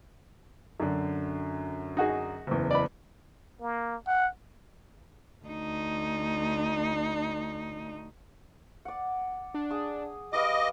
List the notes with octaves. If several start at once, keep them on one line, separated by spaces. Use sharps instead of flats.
F#2 D3
D#4 F#4 G#4
F#1 E2
D5 B5
A#3
F#5
D2 D#4
D5 F#5
D4
G#4 D#6
G3 B4 D#5 F5 D6